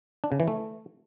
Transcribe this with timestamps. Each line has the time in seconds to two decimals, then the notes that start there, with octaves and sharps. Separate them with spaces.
0.24 D4
0.32 C#3
0.40 E3
0.48 A3